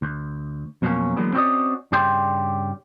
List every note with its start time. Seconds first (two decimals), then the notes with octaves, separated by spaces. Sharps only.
0.02 D2
0.82 F2 B2 F#3 A3 A#3 C#4
1.17 D3 E3 F#3 G#3 A#3 B3
1.33 C4 C#4 E4 F#4 D5 D#5
1.92 G2 C#3 G4 D5 G5 C6